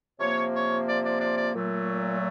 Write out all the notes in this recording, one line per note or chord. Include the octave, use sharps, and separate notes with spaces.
C3 F3 A#3 C#5
C#5
D5
D5
D5
D5
A#2 F#3 A3